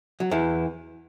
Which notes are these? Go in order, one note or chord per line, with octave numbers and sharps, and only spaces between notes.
F#3
E2 E3